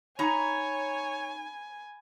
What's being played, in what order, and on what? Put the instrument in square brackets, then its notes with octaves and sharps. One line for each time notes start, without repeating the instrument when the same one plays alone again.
[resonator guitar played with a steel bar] D#4 A#5 [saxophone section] C#5 [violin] G#5 [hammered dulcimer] B5